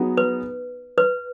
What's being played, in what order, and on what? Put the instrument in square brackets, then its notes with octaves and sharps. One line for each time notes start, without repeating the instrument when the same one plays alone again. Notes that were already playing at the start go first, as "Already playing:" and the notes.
Already playing: [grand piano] F#3 B3 D#4 G#4
[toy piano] B4
B4